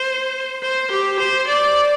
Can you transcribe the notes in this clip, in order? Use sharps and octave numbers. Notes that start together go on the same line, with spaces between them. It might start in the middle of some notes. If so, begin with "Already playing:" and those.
Already playing: C5
C5
G4
C5
D5